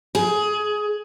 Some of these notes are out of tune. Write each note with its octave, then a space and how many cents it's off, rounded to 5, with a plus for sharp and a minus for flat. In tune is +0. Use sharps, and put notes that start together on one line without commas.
G#4 +15